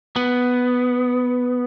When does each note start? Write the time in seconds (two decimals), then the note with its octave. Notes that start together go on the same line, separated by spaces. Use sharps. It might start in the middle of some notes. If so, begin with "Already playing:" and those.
0.16 B3